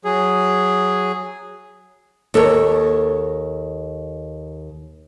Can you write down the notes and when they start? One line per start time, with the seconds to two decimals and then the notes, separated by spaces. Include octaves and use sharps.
0.05 F#3 G#4
2.34 D#2 A4 A#4 C#5